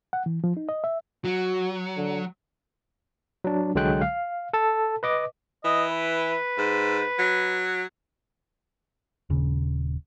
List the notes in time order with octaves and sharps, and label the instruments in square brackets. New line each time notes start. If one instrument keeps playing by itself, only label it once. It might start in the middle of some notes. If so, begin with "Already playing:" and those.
[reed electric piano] F#5
E3
F3
D#4
D#5
E5
[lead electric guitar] F#3 [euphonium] F#4
[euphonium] D3
[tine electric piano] F#3 D4
C2 D3 F#3 G#3 G5 F#6
F5
A4 A5
B4 D#5 D6
[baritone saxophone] E3 [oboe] D#5
[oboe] B4
[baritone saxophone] G#2
F#3
[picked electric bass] D#1 C#3